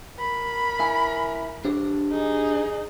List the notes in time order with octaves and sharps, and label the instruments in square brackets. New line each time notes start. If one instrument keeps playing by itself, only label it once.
[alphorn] A#4 [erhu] B5
[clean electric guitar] E4 G#5
D4 G4 C5
[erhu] D#4 [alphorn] G#4